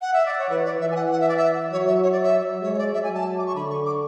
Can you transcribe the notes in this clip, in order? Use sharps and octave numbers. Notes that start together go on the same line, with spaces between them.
F#5
E5
D5
C#5
E3 B4
D5
E3 E5
G#5
F#5
F#5
E5
D5
E5
F#3 C#5
E5
C#5
D5
E5
F#3
G#3 C#5
C#5
D5
F#3 E5
G#5
A5
D6
C#6
D3 B5
C#6
D6